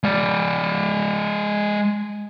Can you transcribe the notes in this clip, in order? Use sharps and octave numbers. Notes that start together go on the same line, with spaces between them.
G#3 D5